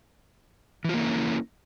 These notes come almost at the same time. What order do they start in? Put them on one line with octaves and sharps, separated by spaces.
E3 F4 A#3 E4 C#4